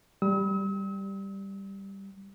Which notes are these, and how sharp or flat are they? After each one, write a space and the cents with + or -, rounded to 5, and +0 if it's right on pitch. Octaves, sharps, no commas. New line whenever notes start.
G3 +0 E6 -45